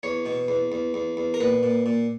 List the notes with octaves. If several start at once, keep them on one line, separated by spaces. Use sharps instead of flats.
E2 C#5
B2
E2
E2
E2
E2
A#4
A#2 B4
A#2
A#2